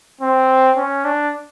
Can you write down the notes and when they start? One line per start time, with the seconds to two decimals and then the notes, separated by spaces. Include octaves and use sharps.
0.21 C4
0.77 C#4
1.05 D4